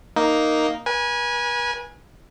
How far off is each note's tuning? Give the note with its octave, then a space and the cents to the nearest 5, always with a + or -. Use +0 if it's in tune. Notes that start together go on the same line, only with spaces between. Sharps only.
A#3 +0 D#4 +0
B4 -40 G#5 -5